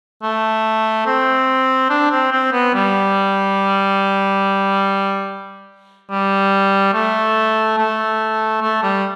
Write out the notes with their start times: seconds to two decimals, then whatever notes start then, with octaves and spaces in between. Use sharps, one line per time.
0.22 A3
1.06 C4
1.90 D4
2.11 C4
2.32 C4
2.52 B3
2.74 G3
6.10 G3
6.94 A3
7.78 A3
8.62 A3
8.83 G3